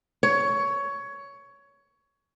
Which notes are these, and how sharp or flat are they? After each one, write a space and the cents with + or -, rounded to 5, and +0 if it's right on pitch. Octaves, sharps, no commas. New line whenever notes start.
C#5 +15